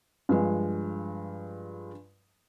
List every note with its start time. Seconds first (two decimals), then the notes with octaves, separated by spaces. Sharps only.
0.29 G2 F3 G#3